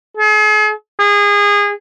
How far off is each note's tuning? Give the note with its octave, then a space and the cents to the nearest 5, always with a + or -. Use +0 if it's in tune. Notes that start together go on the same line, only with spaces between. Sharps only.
G#4 +40
G#4 -25